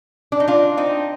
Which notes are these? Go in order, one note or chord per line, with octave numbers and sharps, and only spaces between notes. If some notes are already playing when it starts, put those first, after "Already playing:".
D4
D#4
D4 F4
C4 D#4